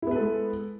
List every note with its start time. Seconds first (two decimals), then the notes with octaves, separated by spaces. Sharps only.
0.02 E4
0.07 B3
0.11 B4
0.16 A4
0.20 G#3